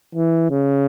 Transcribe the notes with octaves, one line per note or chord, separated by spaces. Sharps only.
E3
C#3